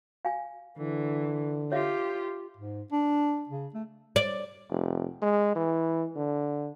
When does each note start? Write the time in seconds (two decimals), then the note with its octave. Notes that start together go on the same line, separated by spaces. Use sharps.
0.25 F5 G#5
0.78 D3 E3
1.72 F4 G4 C#5 E5 F5
2.57 G#2
2.92 D4
3.49 C#3
3.74 A3
4.16 D5
4.70 F1
5.22 G#3
5.55 E3
6.16 D3